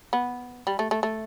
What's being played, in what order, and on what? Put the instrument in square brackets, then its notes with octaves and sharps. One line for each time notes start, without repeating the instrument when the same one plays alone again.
[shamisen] B3
G3
A3
A3
A3